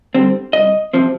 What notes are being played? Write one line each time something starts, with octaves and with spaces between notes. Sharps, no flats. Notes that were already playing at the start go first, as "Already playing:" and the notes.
D3 G3 C4
C2 D#5
C3 F3 C4